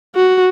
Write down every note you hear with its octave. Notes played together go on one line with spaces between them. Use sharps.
F#4